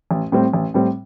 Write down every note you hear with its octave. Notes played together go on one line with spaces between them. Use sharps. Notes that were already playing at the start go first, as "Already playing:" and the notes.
A1
A2 G3 C4
A1
A2 G3 C4